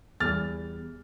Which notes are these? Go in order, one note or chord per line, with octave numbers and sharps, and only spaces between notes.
E2 E3 G3 F6 A6